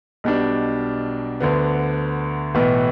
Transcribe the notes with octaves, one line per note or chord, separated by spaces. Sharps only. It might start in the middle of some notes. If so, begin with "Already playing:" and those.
B1 B2 G3 D4
D2 D3 B3
B1 A2 E3 B3